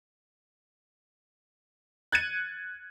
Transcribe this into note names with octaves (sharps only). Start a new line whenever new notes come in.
F#6 G#6 A6 C#7 D#7